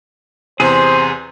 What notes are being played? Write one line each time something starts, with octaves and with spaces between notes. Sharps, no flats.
E2 C3 G#4 C5